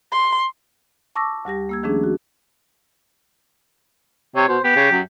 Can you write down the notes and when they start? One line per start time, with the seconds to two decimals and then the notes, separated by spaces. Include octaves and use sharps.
0.12 C6
1.16 A5 C#6 D6 E6 A#6
1.45 D2 G3 G4 A#6
1.69 A#3 E6 G#6
1.83 D#3 F3 A3 C#4 D4 G#4
2.04 F#4
4.36 C3 C#5
4.48 B2 C5
4.64 B3 G4
4.76 C#3
4.91 F#2